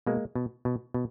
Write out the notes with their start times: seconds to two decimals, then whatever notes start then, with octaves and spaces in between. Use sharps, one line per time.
0.06 B2 G#3 A#3
0.35 B2
0.65 B2
0.94 B2